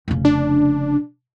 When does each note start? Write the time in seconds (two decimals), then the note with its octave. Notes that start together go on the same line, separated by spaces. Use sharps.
0.08 F1 C#3
0.25 D4